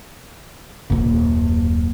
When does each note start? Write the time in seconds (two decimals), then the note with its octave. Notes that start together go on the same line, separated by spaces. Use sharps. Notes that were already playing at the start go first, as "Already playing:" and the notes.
0.90 D#1 F#2